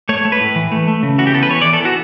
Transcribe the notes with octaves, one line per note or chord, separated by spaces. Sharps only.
A3 C#5
A3
B4
A2
E3
A3
A3
C#3
E3 F#4
G4
B3 A4
B4
E3 C#5
D5
E3
A4
B3 F#4